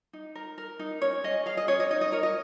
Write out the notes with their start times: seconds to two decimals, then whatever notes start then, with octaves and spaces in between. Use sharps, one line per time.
0.13 D#4
0.35 A#4
0.58 A#4
0.79 D#4
1.02 C#4 C#5
1.24 G#4 D#5
1.46 G#4 F5
1.57 D#5
1.68 C#4 C#5
1.80 D#5
1.90 D#4 D#5
2.01 D#5
2.12 A#4 C#5
2.23 D#5